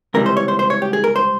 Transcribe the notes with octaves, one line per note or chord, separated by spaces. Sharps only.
C#2 C3 E3 G3 A#4
C5
C#5
C5
C5
C#5
G4
G#4
A#4
C5